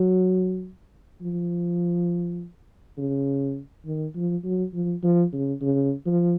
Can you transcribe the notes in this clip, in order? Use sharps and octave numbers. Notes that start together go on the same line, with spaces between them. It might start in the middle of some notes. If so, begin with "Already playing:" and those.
Already playing: F#3
F3
C#3
D#3
F3
F#3
F3
F3
C#3
C#3
F3